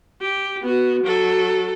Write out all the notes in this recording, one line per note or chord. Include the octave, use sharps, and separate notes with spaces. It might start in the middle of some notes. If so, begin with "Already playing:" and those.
G4
B3 F#4
F#3 A4